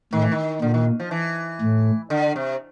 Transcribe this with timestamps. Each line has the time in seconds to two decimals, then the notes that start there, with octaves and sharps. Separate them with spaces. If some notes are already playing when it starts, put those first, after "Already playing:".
0.13 A2 D#3
0.22 E3
0.32 D#3
0.62 A#2 D3
0.74 D#3
1.00 F3
1.11 E3
1.62 A2
2.10 D3
2.36 C3